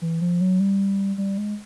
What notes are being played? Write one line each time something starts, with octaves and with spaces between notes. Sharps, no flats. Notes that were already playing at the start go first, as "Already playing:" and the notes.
E3
F3
F#3
G3
G3
G#3